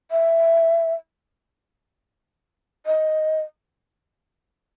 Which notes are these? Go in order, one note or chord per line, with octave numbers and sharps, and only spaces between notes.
E5
D#5